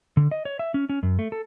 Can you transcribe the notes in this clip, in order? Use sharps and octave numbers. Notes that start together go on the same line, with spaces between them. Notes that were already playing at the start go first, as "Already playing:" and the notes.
D3
D#5
C#5
E5
C#4
C#4
F#2
A3
A4